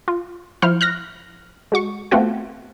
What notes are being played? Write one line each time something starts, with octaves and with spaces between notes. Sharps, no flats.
F4
F3 E4 C5 F6
F6 F#6 A#6
G#3 F#4 C#6
A3 B3 C4 F4 F#4 G5